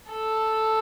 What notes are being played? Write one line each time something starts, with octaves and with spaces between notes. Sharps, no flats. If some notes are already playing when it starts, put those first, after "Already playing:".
A4